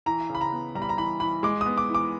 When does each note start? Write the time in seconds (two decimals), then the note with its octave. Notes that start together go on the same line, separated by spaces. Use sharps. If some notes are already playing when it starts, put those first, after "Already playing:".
0.06 E3 A#5
0.30 C#3
0.35 B5
0.41 A#5
0.52 B3
0.75 G3 A#5
0.82 B5
0.89 A#5
0.97 E3 B5
1.20 E3 B5
1.43 G#3 D6
1.61 B3 D#6
1.78 D6
1.89 E3
1.94 D6